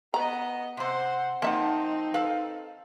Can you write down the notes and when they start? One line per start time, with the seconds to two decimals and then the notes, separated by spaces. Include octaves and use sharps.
0.14 B3 B4 D#5 A#5
0.77 C3 C4 C5 F#5
1.42 F3 A#3 C4 D#4 E5 F#5 A5
2.14 A4 B4 F5